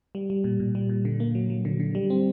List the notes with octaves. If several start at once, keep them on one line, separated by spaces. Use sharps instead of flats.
G3
G3
A#2
A#2
G3
A#2
D3
A#3
F#3
F#3
D3
D3
G3
C4